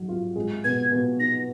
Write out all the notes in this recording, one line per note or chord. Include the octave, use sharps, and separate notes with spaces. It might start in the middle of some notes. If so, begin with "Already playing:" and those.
Already playing: G#2 F#3
F4
G#3
B2 G#6
B2
D#4 A#6